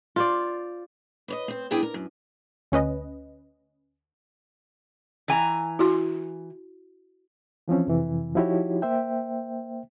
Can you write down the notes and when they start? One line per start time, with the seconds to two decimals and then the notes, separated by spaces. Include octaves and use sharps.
0.16 F4 C5 D5
1.28 B4 C#5 D#5
1.48 C4 C5
1.71 G2 B3 D4 E4 G#4 G5
1.83 A#4
1.94 F#2
2.72 D2 C#4 B4 D#5
5.28 E3 G#5 A#5
5.79 E4 F#4 C6
7.68 E3 F3 C4 C#4
7.87 F2 C3 E3
8.35 F3 D#4 E4 F#4 G4 C#5
8.82 A#3 C5 E5 G5